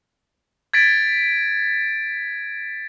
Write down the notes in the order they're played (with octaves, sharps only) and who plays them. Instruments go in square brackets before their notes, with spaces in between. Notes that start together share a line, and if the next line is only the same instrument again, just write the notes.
[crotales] G#6 A6 B6 D7